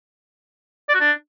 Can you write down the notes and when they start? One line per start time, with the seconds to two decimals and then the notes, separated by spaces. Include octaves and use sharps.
0.89 D5
0.94 F#4
1.00 D4